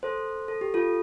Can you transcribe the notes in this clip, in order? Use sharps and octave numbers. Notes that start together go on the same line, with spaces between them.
A4 C5
A4
G4
F4 A4